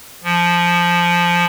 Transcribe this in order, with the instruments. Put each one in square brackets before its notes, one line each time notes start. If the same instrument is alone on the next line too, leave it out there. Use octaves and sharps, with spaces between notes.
[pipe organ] F3